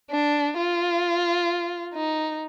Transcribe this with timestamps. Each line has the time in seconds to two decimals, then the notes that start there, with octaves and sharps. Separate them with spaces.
0.11 D4
0.57 F4
1.94 D#4